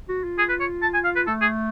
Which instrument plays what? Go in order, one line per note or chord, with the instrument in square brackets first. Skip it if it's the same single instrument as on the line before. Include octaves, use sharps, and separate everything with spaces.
[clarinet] F#4
F4
[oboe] G#4
B4
C#5
A5
G#5
F5
B4
[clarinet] A3 [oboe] A4
[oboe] G#4